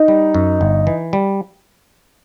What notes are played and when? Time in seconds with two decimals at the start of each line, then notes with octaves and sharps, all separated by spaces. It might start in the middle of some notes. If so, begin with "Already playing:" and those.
Already playing: D#4
0.08 G3
0.35 F#2
0.61 G1
0.87 E3
1.13 G3